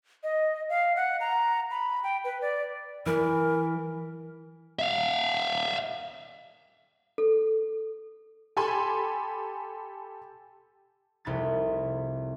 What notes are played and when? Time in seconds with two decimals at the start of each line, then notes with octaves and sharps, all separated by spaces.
0.23 D#5
0.69 F5
0.96 F#5
1.20 A#5
1.71 B5
2.04 G5
2.24 B4
2.41 D5
3.06 E3 A#4
4.79 E5 F5
7.18 A4
8.57 G4 A4 G#5 B5 C6
11.25 F1 C2 B5 G#6 A6